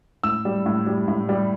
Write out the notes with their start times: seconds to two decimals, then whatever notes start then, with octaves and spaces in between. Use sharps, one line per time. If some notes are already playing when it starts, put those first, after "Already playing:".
0.23 A2 E6
0.45 G3
0.66 A2
0.86 G3
1.08 A2
1.29 G3